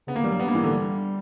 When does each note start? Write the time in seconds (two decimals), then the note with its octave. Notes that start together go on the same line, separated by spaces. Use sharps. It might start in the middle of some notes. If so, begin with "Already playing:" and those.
0.07 C#3 B3
0.15 D3 A#3
0.23 E3 G3
0.32 F#3 A#3
0.39 G3 B3
0.48 A#3
0.55 E3
0.64 D3
0.72 G3